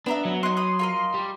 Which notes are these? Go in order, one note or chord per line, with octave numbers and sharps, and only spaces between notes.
B3 D4 E5 A#5 B5
F#3
D#4 C6 F#6
B5 D#6
F4 A#4 D#5
G3